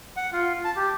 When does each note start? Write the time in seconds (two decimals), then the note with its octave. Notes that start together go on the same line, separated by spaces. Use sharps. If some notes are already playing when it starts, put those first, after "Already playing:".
0.17 F#5
0.33 F4
0.65 A5
0.76 G4